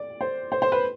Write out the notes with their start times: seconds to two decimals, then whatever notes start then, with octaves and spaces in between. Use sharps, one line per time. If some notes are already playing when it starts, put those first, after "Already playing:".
Already playing: D5
0.21 C5
0.52 C5
0.62 C5
0.72 B4